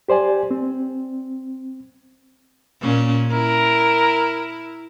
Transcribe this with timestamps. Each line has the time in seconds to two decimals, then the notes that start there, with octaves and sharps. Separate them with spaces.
0.08 G4 C5 D5 G#5
0.51 C4
2.81 A#2 C#4
3.31 E4 A#4